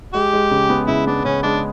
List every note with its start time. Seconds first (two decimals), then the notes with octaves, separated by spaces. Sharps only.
0.14 G#3 G4
0.33 G#3
0.51 C#3
0.69 B3
0.87 C#3 E4
1.07 B3 D4
1.25 C#3 C#4
1.43 G#3 D4